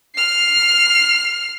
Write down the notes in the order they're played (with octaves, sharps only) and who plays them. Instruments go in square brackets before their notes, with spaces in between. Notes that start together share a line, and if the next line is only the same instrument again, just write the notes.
[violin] F6 C7